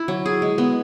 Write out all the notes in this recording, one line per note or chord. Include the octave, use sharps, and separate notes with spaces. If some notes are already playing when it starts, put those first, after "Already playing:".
Already playing: E4
F#3
G#4
G#3
B3